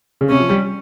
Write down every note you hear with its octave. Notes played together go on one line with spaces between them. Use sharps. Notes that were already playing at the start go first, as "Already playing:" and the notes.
C#3
C3 C#4
F3
G3